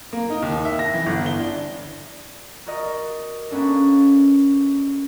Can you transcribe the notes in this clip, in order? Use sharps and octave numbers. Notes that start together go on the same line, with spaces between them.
A#3
D#4
D#2
E5
A#6
E3
G1
G7
D4
F#4 A#4 D5 D#5
A#3 B3 C#4 D4 A4